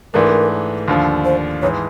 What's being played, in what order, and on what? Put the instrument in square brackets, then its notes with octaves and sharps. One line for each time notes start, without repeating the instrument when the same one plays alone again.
[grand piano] G#2 E3 A3 D4 [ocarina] A#4
[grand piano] D#2 D3 F3
[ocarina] C5
[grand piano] G#2 E3 G#3 [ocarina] C#5